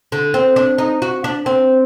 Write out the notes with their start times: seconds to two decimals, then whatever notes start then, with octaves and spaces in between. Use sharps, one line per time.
0.12 D3
0.34 C4
0.56 D4
0.78 D#4
1.02 F#4
1.24 D4
1.46 C4